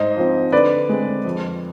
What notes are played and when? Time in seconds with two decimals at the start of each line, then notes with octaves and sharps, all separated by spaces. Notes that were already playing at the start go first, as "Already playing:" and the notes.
Already playing: G#2 C5 D#5
0.16 F3 C4
0.52 D3 B4 D5
0.89 G#3 C4
1.25 F2